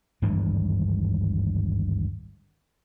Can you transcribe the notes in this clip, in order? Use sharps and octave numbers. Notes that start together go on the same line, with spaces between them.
G#1 D2 G2 E3